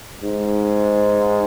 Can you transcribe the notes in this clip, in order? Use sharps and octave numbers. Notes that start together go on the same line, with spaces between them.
G#2